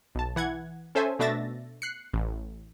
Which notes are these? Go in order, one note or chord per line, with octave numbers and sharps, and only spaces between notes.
B1 A5
E3 F#5 G#6
C#4 A4 C5 E5 G#5
B2 A3 D4 E5 A6 A#6
F#6 C7 C#7
A1